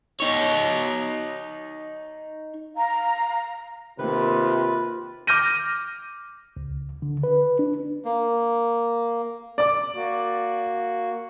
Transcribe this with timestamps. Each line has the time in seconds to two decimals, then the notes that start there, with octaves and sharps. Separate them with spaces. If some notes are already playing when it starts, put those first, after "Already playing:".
0.20 D#4 C#5
2.76 F5 A#5
3.99 C3 D#3 A#3 F4 B4
5.27 D6 F6 G6 A#6 D#7
6.57 C#2
7.02 D3
7.23 B4
7.59 D4
8.05 A#3
9.58 D5 D6
9.95 A#3 F#4